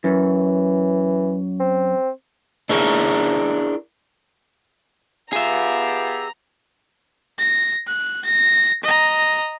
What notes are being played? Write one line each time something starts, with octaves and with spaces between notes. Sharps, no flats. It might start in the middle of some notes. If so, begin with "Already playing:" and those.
F#2 E3
C4
D4 E4 G#4 A#4 C#5 E5
B3 F4 G4 G#4 E5 A#5
A#6
F#6
A#6
D#5 A#5